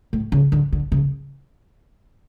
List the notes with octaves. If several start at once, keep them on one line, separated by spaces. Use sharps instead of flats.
A2
C#3
D3
D3
C#3